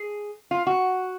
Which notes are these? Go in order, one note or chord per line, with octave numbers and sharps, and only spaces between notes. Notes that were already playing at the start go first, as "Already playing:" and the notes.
Already playing: G#4
F4
F#4